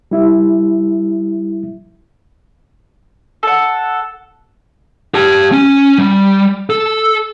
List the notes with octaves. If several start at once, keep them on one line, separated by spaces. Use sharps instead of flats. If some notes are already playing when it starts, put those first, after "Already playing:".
G3 E4 E5
A4 F#5
G4 A5
C#4
G3
A4